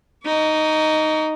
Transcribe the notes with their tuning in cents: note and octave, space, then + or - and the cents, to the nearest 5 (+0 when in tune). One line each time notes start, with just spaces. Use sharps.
D#4 +0 C#6 +45